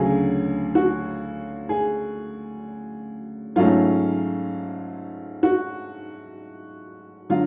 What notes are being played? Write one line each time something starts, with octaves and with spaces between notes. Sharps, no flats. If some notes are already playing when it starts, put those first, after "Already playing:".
Already playing: D2 C#3 F#3 G#4
F#4
G#4
G#2 F#3 A3 C#4 F4
F#4
D3 F#3 F4